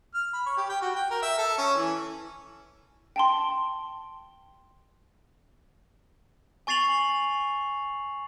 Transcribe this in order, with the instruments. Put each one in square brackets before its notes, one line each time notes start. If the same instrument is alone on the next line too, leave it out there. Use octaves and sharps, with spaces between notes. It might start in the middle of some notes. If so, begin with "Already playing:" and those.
[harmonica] F6
B5
C#5
G4
G5
F#4
G5
A#4
E5
A4
C#4
E3
[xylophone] G5 A5 C6
[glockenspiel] G#5 C#6 A6 C7 F7 F#7